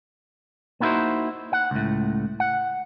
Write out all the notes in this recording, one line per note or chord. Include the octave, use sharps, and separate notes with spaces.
A#3 B3 D#4 E4 F#4 C5
F#5
C#2 A2
F#5